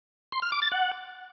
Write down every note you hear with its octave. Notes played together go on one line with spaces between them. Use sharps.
C6
F6
D6
A6
F#5